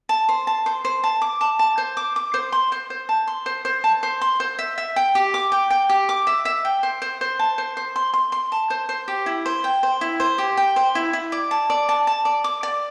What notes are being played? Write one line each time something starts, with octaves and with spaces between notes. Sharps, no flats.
A5
C5
A5
C5
C5
A5
D6
A5
A5
C5
D6
D6
C5
C6
C5
C5
A5
C6
C5
C5
A5
C5
C6
C5
E5
E5
G5
G4
D6
G5
G5
G4
D6
E5
E5
G5
C5
C5
C5
A5
C5
C5
C6
C6
C6
A5
C5
C5
G4
E4
C5
G5
C5
E4
C5
G4
G5
C5
E4
E4
D5
A5
D5
A5
A5
D5
D6
D5